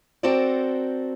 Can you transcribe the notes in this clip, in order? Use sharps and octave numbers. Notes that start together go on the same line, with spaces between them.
C4 F#4 A4 A#4 C5 D5